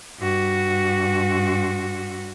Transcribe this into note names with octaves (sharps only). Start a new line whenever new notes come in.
G2 F#4